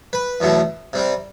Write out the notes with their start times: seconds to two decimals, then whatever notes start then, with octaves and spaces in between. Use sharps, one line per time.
0.13 B4
0.40 E2 B2 F#3 A3
0.93 C3 G3 C4